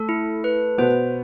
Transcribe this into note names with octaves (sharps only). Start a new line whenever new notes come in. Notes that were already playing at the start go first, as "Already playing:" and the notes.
Already playing: A3 A4
E4
B4
B2 B3 C5